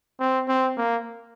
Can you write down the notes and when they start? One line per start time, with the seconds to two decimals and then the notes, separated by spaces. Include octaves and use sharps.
0.20 C4
0.48 C4
0.77 A#3